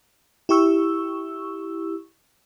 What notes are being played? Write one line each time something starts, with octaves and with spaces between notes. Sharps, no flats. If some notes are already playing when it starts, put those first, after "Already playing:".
E4 G4 C#6 E6